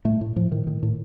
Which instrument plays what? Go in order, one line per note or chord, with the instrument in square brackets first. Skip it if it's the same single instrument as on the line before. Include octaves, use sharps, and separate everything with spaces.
[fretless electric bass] A2 A3
A2
A2 F3
A2 D#3
A2 D#3
A2